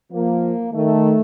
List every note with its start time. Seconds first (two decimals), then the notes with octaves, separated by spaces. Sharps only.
0.13 F3 A#3
0.73 D#3 A3